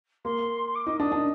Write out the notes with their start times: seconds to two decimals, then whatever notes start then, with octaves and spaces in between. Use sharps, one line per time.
0.25 A#3 C6
0.75 D6
0.87 D#4
0.99 D4 D#6
1.12 D4